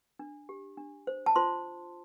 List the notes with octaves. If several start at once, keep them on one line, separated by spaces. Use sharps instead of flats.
D4
G4
D4
C5
A5
F4 C5 C6